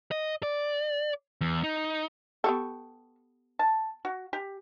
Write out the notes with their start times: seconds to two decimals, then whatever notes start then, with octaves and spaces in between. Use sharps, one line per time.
0.11 D#5
0.43 D5
1.41 E2
1.63 D#4
2.44 B3 G4 A4 C#6
3.59 A5
4.05 F#4
4.33 G4